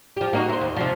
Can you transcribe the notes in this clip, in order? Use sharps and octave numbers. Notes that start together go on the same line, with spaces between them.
F3 G4
A#3 D#4 F#4
E4 C5
D#2
C3 F3